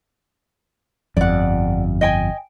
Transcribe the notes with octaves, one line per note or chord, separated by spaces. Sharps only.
G1 F2 D5 F#5
D#5 G5 G#5